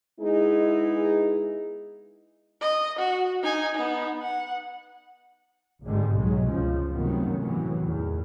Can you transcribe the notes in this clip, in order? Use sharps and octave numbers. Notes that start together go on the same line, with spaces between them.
G#3 B3 D#4 E4 G#4
D#5
F#4
D#4 G#5
B3 D#4
F#5
G#1 G2 D3 G3 G#3
B1 B2 F#3 G#3
C#2 C#3 F3
F#2 A2 C3 D#3 F#3 B3
A2 E3 F#3
E2 D#3